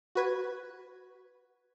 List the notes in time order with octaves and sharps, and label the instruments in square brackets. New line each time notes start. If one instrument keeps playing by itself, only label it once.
[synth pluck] F#4 B4 G#6